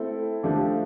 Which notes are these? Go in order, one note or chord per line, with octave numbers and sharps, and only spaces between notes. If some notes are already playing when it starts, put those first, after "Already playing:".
Already playing: A3 C4 E4 A4
F3 A3 D4 G4